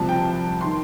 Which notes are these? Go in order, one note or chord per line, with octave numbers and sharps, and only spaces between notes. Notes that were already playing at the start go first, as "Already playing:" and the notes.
Already playing: C2 C3 F3 A5
G5
D#3 C6